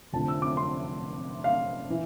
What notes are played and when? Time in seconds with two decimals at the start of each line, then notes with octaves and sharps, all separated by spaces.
0.13 F1 F2 D3 F3 A5
0.28 E6
0.42 D6
0.57 C6
1.44 F5
1.90 E3